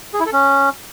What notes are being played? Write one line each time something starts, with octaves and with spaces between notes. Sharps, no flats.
G#4
E4
A4
C#4